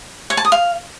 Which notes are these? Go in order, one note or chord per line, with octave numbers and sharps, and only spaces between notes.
C#5
A5
D#6
F5